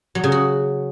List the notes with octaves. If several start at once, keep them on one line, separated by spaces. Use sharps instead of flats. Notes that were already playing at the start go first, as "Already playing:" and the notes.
F#3
C#3
F#4